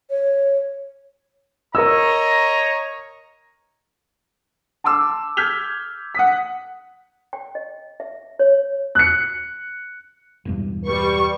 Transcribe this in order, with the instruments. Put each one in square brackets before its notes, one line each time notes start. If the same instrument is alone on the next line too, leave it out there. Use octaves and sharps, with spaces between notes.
[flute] C#5
[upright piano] A#4 E6 [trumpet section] C#5 D#5 A#5
[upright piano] A5 C6 D6 E6
F6 G6 G#6 B6 F7 G7
F#5 D#6 B6
[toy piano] G5
D#5
E5
C#5
[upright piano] F#6 C#7
[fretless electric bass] E1 E2 G2
[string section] G3 C#6 [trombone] B4